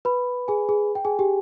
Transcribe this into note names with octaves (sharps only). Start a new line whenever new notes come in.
B4 B5
G#4 G#5
G#4 G#5
G5
G#4 G#5
G4 G5